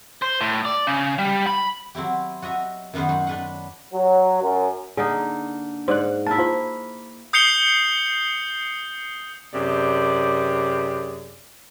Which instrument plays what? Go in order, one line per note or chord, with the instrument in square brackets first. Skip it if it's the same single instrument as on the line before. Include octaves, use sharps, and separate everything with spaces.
[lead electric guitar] C5
A2
D5
C#3
G3
B5
[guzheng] F#3 C4 E4 G4
F#4 D#5 E5 A#5
F#2 D#3 B3 B4 C5
F#3
D4 B4 F#5
[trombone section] F#3
F#2
[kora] D3 A#3 D#4 [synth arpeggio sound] G#4
[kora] G#2 [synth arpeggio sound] C5 D5 F#6
[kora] A#3 E4 [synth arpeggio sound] A5
[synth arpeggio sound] F4 C5
[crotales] D#6 G6 C7 C#7 F7 G7
[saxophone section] F#2 C3 G#4 D5